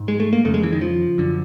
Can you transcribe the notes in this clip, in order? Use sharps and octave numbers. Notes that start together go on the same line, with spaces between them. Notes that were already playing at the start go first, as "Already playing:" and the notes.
Already playing: G#2
G#3
A3
A#3
F2 C#3 A3
G#3
E3
D#3
F3
F#2 D3